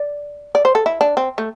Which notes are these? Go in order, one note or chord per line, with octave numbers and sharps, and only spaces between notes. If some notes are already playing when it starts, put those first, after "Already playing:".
Already playing: D5
D5
C5
A4
E4
D4
C4
A3